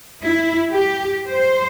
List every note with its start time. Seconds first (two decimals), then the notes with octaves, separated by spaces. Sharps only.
0.23 E4
0.72 G4
1.29 C5